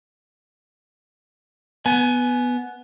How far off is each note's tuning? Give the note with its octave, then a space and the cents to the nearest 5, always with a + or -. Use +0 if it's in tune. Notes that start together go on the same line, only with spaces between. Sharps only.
B3 +0 G#5 +20